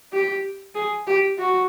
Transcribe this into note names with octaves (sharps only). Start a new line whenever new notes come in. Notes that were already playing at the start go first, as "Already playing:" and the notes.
G4
G#4
G4
F#4